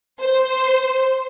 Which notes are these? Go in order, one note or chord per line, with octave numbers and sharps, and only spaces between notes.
C5